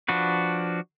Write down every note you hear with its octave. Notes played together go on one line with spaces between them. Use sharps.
F3 D4 F#4 B4